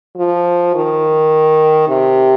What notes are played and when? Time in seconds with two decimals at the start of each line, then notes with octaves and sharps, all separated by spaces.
0.18 F3
0.75 D#3
1.89 C3